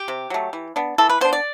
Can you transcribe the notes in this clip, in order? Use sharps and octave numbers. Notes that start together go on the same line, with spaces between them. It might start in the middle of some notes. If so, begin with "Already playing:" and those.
Already playing: G4
C3
F#3 A3
E3
B3 D4
E3 A4
B4
B3 D4 C5
D5